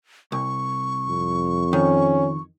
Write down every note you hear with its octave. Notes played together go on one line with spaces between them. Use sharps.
C2 C#6
F2
D#3 C#4